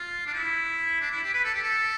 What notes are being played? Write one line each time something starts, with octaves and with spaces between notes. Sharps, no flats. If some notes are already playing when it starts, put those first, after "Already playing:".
Already playing: F4
D4
E4
D4
E4
G4
B4
A4
G4
A4